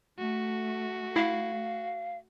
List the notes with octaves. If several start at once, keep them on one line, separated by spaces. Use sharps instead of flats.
A3 F#4
E4 F5